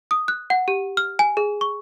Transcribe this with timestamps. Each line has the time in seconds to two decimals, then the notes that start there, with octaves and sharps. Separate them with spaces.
0.11 D#6
0.28 F#6
0.50 F#5
0.68 G4
0.97 F6
1.19 G#5
1.37 G#4
1.61 C#6